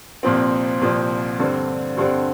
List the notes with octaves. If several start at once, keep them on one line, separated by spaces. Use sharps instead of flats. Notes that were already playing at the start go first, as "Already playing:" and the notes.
C2 A#2 F3 C4
C2 A#2 F3 C4
G2 D3 G3 C4
G2 D3 G3 C4